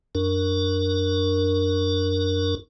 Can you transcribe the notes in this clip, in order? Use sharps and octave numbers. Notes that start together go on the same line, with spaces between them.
F#2 D4 A#4